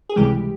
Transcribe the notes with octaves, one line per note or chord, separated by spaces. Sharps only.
G#4
C#2 C3 E3 G3 G#3 G4